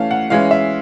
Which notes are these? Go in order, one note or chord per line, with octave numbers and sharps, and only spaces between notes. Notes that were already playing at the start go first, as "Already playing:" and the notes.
Already playing: E3 A3 C#4 F5
F#5
E3 G#3 C#4 E4 F5
E5